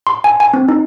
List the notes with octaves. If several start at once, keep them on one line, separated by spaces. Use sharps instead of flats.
C6
G#5
G#5
C4
D#4